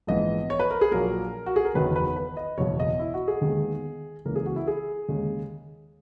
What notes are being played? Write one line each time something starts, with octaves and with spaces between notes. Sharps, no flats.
A#1 G#2 E3 B3 D#5
C#5
B4
A#4
G#4
A#1 A#2 F#3 A#3 A#4
F#4
G#4
A#4
F#1 E2 D#3 F#3 B3 B4
B4
B4
D#5
F#1 E2 B2 C#5
D#5
E4
F#4
G#4
D#2 D#3 G#3 B3
C#2 C#3 E3 A#3 A#4
G#4
F#4
E4
G#4
D#2 C#3 G#3